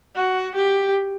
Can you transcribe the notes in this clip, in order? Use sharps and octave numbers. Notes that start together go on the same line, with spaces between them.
F#4
G4